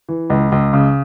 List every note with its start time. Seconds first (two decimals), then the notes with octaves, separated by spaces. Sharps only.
0.09 E3
0.30 C#2
0.52 C#2
0.73 C#3